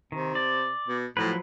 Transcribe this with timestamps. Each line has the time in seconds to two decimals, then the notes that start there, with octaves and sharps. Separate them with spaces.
0.12 C3 D#3
0.35 D5
0.88 B2
1.17 A2 F3 F#3 B4